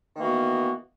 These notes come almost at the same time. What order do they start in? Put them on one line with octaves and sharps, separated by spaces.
D#3 A#3 E3 F#4 B3